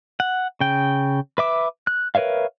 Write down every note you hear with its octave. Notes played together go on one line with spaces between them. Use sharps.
F#5
C#3 G5
B4 E5 D6
F#6
A#4 B4 C#5 E5 F5